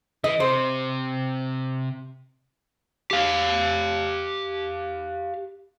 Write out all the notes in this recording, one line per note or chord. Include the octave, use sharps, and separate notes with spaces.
E3 D#5
C3 C5
G4 F5